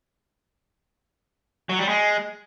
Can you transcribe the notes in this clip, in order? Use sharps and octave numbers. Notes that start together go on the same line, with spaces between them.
F#3
G3
G#3